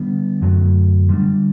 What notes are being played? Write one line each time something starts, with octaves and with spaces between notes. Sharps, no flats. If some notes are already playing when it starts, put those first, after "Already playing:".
Already playing: D3 G3 B3 D4
F#2 D3 F#3 A3
D3 G3 D4